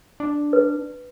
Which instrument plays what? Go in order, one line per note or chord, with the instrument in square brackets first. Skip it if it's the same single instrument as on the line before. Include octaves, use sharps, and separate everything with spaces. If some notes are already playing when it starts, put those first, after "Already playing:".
[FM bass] D4
[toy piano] B4